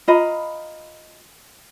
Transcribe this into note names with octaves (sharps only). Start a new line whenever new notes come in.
F4 D#5 A#5 B5